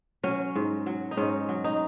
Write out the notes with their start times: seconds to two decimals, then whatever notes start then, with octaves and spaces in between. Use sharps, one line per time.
0.23 F#3 C#4
0.55 G#2
0.86 F#3
1.11 D#4
1.17 G#2 C#4
1.49 F#3
1.64 D#4